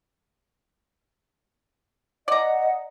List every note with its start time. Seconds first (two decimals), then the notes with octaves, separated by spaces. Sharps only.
2.28 D5 D#5 F#5 A#5